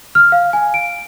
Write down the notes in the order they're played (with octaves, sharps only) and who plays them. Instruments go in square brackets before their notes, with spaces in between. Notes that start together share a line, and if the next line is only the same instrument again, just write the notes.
[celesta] F6
F5
G#5
D7